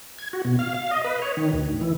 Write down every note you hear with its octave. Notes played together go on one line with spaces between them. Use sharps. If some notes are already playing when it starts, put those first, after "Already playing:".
G#6
F#4
B2
F5
F5
D#5
B4
C#5
D#3
D2
E3